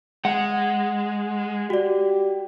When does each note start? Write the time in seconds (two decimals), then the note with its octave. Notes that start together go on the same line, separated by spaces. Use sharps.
0.25 G#3 F#5
1.70 F#4 G4 D5